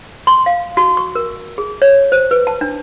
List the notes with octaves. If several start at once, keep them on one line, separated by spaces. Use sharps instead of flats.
C6
F5
F#4
C#6
A#4
G#4
C#5
C5
B4
A5
D4